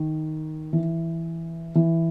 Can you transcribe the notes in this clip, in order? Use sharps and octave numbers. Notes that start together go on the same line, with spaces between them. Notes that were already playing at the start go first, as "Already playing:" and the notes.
Already playing: D#3
E3
E3